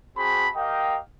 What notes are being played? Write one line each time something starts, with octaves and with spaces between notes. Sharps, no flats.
C4 F#4 G#4 A5 B5
G4 A#4 D#5 F5 G5